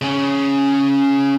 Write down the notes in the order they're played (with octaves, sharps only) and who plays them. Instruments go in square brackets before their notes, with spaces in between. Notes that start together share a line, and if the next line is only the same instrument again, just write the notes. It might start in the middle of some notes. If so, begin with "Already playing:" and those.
[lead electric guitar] C#3 C#4